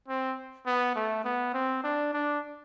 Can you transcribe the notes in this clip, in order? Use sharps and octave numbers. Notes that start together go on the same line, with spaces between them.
C4
B3
A3
B3
C4
D4
D4